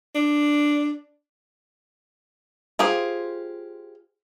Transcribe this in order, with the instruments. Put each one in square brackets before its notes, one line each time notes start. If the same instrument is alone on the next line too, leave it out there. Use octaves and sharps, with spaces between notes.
[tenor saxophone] D4
[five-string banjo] F4 G4 G#4 C5